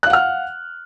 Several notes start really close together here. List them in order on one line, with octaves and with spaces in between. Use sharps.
F#6 F5 F#5 F6